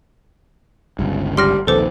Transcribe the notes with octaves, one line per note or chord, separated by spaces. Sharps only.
G1 C#2 G2
G3 C6 F6 A#6
A#1 D#2 C3 A4 B4 C5 D6